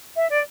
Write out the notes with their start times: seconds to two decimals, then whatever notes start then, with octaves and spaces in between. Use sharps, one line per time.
0.16 E5
0.30 D5